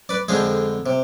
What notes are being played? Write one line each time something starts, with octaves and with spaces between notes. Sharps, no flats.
B4 D5
F2 D3 F3 G#3 G#4 C5
C3